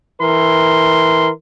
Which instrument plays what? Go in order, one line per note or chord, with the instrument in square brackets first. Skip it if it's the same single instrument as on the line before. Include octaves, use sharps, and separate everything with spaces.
[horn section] E3 A#4 C6